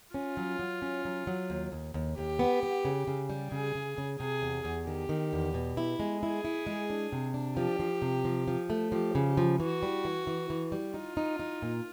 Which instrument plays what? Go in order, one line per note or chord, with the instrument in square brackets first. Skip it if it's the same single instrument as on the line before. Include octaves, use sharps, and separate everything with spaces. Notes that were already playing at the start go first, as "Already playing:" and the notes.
[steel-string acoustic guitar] C#4 [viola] F4
[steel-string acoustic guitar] F#3
F#3
C#4
F#3
F#3
D#2
D#2
D#2
[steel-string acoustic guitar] D#2 [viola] G4
[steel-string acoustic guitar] B3
B3
C#3
C#3
G3
[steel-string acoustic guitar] C#3 [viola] G#4
[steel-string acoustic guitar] C#3
C#3
[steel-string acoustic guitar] C3 [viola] G#4
[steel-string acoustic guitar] E2
E2
[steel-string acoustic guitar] D#3 [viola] G4
[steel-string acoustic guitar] D#3
E2
B2
E4
G#3
[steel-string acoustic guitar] E4 [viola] G#4
[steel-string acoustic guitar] E4
G#3
D4
C3
D4
[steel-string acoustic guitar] F3 [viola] G4
[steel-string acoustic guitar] F3
C3
F3
F3
A3
[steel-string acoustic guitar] F3 [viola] G4
[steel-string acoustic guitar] C#3
[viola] G4
[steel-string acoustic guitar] F3
[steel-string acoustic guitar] E3 [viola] F#4
[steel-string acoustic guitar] G3
E3
E3
E3
G3
[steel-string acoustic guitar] D#4 [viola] F4
[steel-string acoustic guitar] D#4
D#4
A#2